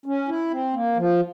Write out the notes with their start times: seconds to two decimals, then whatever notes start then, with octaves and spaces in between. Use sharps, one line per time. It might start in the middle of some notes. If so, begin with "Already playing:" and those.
0.06 C#4
0.28 E4
0.51 C4
0.74 A#3
0.97 F3